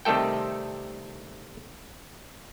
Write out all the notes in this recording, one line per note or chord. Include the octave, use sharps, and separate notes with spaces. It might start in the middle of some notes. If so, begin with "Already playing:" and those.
C3 D#3 G3 A3 A4 G5